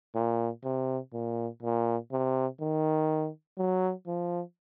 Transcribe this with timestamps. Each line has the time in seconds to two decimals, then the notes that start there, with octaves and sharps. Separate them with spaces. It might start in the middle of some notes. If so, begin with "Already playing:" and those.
0.15 A#2
0.64 C3
1.13 A#2
1.62 A#2
2.12 C3
2.60 D#3
3.58 F#3
4.07 F3